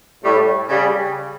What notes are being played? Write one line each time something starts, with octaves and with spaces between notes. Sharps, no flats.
A2 G3
C#3 G3